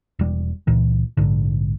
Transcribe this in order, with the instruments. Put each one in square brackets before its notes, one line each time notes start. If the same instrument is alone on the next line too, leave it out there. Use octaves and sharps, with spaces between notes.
[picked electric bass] E1 G3
C#2 A#2 E3
A#1 G#2 D3